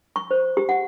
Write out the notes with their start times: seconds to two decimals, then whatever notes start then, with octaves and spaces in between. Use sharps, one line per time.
0.16 C#6
0.31 C5
0.57 G4
0.69 F#5